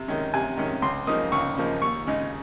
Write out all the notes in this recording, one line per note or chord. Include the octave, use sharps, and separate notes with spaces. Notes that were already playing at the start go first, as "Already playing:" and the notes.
Already playing: C3
D#3 G#3 C#4
C3 G#5
D#3 G#3 C#4
C#2 C6
C#3 F3 A#3 D#4 D#6
C#2 C#6
C#3 F3 A#3 D#4
D#2 C#6
C#3 G#3 D#4